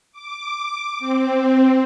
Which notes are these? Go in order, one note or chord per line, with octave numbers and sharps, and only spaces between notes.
D6
C4